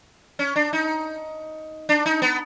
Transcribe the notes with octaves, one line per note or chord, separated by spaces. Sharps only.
C#4
D4
D#4
D4
D#4
B3